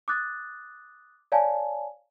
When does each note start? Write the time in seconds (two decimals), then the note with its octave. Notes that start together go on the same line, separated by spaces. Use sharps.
0.08 D6 D#6 F#6 A6
1.32 C#5 D5 F5 G#5 A5